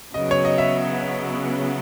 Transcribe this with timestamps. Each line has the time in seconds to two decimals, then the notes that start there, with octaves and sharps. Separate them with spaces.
0.14 C#3 F#3 B3 D#5
0.31 C#5
0.45 D#5
0.58 E5